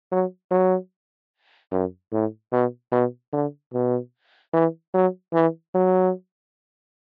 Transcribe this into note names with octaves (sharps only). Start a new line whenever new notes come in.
F#3
F#3
F#2
A2
B2
B2
D3
B2
E3
F#3
E3
F#3